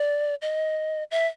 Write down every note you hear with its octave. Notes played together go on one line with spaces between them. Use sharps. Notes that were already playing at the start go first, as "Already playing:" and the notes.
Already playing: D5
D#5
E5